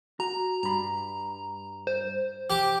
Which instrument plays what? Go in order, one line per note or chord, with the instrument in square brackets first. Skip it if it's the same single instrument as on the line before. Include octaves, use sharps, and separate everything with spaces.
[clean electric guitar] F#4 [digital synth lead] A#5
[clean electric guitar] G2 B5 [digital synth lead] A#5
[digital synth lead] C5
[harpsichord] G4 D6